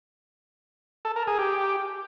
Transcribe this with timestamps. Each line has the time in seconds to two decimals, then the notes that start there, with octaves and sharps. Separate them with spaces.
1.05 A4
1.16 A#4
1.27 G#4
1.39 G4